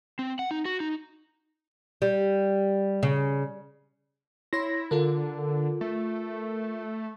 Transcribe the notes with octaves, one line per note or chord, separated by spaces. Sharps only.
C4
F#5
D#4
F#4
D#4
G3
C#3
E4 C#5 C6 A#6
D3 F4 A4 A#4
A3